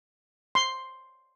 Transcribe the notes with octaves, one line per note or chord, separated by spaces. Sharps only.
C6